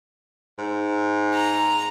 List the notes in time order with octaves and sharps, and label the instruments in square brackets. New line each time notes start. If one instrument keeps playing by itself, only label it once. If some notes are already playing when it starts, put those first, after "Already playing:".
[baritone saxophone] G#2
[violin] A#5